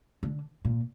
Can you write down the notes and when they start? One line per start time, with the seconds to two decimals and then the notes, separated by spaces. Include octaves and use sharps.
0.23 D3
0.65 A#2